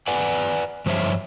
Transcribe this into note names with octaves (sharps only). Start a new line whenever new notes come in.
B4 D5 F#5 G#5
G2 F3 C5 C#5 E5